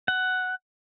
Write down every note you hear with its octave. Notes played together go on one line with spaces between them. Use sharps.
F#5